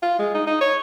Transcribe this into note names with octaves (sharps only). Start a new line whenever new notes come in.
F4
G#3
D#4
D#4
C#5